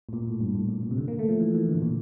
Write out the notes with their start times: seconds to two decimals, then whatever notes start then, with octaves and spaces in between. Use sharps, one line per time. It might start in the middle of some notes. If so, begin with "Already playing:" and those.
0.09 A2
0.13 A#2
0.28 A2
0.41 G2
0.55 A2
0.69 A#2
0.83 A#2
0.91 C3
0.97 D3
1.08 A#3
1.19 A3
1.29 F3
1.40 E3
1.54 E3
1.69 D3
1.75 A2
1.82 A#2